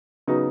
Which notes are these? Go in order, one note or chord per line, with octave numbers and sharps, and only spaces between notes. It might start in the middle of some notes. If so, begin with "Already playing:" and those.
C#3 F#3 B3 D#4